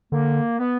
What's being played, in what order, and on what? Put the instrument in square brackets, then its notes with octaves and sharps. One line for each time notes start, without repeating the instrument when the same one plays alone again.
[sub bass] D3 [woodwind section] A#3
[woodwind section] B3